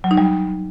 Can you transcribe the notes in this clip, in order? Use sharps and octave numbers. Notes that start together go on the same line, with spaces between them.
F#3
D#4
G3